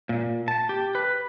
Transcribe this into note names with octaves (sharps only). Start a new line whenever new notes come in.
A#2
A5
G4
B4